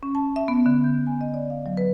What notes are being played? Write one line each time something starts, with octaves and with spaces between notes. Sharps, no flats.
C#4
A5
E5
B3
D3
G6
G#5
D#5
D5
F5
F#3
B4